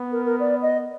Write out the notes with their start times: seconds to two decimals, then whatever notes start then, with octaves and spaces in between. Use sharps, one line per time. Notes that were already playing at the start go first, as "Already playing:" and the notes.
Already playing: B3
0.12 A#4
0.26 A#4
0.40 D5
0.62 D#5